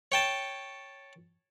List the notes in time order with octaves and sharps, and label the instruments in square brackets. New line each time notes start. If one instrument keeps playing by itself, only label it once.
[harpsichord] C#5 G5 A5